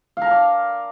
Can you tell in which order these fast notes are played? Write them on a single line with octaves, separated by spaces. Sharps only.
F5 A#4 A5 D5